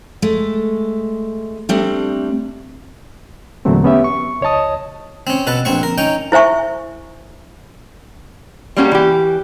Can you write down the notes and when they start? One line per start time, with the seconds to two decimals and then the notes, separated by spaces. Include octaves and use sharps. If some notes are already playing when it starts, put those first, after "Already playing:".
0.22 G#3 A3
1.69 G3 A3 C4 D4
3.65 E2 A#2 D3 F#3 A3 C4
3.84 B3 C#4 G4 E5
4.04 C#6
4.41 C#2 C#5 D#5 A5 D#6
5.27 C4 C#4
5.47 B2 A4 B4
5.65 A#1 C4 C#6
5.83 A#4
5.98 C#4 D#4 G5
6.32 E4 C5 E5 G#5 C#6
8.77 G3 G#3 A#3 C#4 F#4 G4
8.92 E3 G4